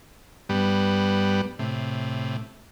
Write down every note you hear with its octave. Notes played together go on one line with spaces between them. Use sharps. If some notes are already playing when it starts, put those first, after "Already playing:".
G2 G3 B3
A2 C3